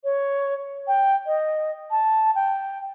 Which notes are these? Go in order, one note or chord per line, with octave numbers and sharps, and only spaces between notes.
C#5
G5
D#5
A5
G5